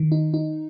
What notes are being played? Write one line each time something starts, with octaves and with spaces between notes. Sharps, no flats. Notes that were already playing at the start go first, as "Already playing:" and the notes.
Already playing: D#3
D#4
D#4